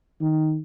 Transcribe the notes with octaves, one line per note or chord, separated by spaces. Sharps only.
D#3